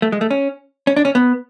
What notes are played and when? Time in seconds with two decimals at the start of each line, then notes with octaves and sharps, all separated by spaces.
0.02 A3
0.12 G#3
0.21 A3
0.31 C#4
0.87 C#4
0.96 D4
1.05 C#4
1.15 B3